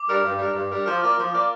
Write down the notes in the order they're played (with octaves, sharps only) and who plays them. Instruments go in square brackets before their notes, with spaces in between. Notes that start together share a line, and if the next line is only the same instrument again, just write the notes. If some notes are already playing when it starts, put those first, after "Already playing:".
Already playing: [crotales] D6
[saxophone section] G3 D4 A#4
G2
G3 D4 A#4
G2
G3 D4 A#4
[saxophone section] F3 [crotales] F6
[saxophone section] A#3 F4 D5
F3
A#3 F4 D5